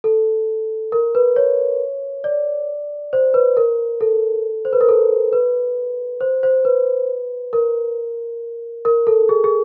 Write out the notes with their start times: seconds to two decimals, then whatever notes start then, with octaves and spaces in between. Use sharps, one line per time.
0.04 A4
0.92 A#4
1.15 B4
1.36 C#5
2.24 D5
3.13 C5
3.34 B4
3.57 A#4
4.01 A4
4.65 C5
4.73 B4
4.81 A#4
4.89 A4
5.33 B4
6.21 C5
6.43 C5
6.65 B4
7.53 A#4
8.85 A#4
9.07 A4
9.29 G#4
9.44 G#4